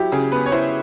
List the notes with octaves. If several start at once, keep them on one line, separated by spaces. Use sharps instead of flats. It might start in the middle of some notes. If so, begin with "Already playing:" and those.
Already playing: F#3 E4 G4
C#3 G#4
B3 B4
C#5
E4 C5